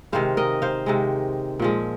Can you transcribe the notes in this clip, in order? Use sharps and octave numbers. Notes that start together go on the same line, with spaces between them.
C3 D#3 G#3 C5 F5
A#4 D#5
C5 F5
C3 D#3 G#3
A#2 F3 G#3